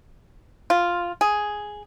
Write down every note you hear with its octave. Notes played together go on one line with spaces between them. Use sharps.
F4
G#4